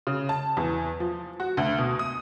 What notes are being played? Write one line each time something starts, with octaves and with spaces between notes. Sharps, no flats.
C#3
A5
E2
F3
F#4
D2
B2
D#6